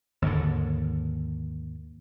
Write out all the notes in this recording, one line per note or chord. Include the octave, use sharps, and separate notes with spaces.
D#2 G#2 D3